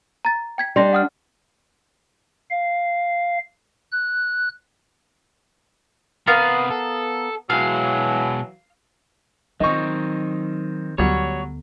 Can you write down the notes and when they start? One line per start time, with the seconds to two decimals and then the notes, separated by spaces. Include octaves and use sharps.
0.25 A#5 A6
0.58 G5 G#6 B6
0.76 G3 D4 D#5 C6 A#6
0.93 F#5 D#6 F6
2.50 F5
3.91 F#6
6.27 C3 B3 A#4 B4 F5
6.70 A4
7.50 B2 E3 F#3 G#3 F5
9.60 D#3 F#3 C4 D#4 D#5 C#6
10.98 D2 F#3 G3 B3 C#5